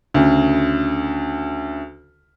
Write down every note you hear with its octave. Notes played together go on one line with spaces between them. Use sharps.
D2 C#3